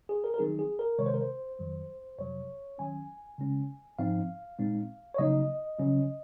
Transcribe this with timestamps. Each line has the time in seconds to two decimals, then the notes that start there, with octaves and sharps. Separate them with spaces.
0.09 G#4
0.24 A#4
0.34 A#4
0.38 D#3 F#3 C4 D#4 G#4
0.59 G#4
0.79 A#4
0.99 C3 D#3 G#3 C#5
1.06 C5
1.14 A#4
1.21 C5
1.59 F2 D#3 F#3
2.19 F2 C3 F#3 C#5
2.78 D#3 F#3 C#4 G#5
3.38 C#3 G#3 C#4
3.99 G#2 F3 C4 D#4 F5
4.59 A#2 G#3 C4 D#4
5.14 C#5
5.18 C#3 F#3 A#3 D#4 D#5
5.79 C#3 F#3 C#4